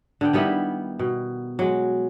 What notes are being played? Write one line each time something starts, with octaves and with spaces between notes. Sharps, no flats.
D3 B3 G5
D#3 G3 B3 E4
B2
F#3 G#3